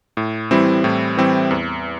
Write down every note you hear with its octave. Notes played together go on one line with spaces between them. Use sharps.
A2
E3 G3 C4 E4
A2
E3 G3 C4 E4
E2